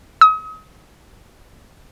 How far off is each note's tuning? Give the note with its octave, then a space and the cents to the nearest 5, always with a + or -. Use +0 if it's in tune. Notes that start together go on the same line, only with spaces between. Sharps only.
D#6 +40